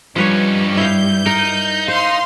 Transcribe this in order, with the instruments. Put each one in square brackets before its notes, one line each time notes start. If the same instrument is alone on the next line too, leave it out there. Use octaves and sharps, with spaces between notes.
[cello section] G2 G3 [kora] F3 B4 C#5 [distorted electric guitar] C#4 D#4
[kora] E4 F5 [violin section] G6
[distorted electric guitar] D#4 [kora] A#4
[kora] C5 [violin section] F5 C6